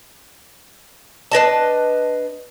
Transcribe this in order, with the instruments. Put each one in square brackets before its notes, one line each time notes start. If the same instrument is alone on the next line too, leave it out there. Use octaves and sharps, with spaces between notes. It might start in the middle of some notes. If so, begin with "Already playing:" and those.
[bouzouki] D4 B4 D#5 A5